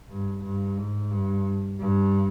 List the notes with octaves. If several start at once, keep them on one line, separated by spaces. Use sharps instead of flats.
G2
G2
G#2
G2
G2